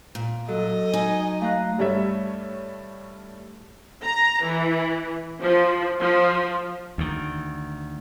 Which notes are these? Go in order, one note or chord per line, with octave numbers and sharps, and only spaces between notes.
A#2
F#3 A4 D#5
D#4 G#5
A3 F5 A#5 F#6
G2 G3 A3 C#5 E5
A#5
E3
F3
F3
D2 D#3